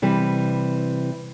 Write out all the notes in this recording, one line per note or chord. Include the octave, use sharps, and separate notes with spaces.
C3 E3 G3